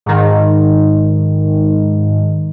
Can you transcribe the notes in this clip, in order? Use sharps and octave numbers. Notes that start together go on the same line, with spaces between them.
G#2 D#3